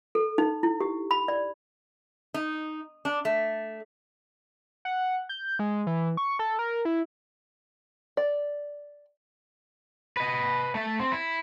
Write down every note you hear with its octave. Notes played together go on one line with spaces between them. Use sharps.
A4
D#4
E4
G4
B5
D5
D#4
D4
A3
F#5
G6
G#3
E3
C#6
A4
A#4
E4
D5
B4 D#5
A3 E5
C4
E4